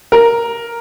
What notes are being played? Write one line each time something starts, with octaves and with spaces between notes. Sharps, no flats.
A#4